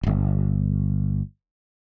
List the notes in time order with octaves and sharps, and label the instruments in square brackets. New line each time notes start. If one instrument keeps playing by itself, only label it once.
[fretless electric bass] D1 G1